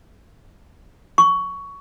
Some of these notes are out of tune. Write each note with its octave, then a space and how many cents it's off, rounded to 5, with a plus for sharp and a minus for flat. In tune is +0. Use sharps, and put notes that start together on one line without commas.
C#6 +15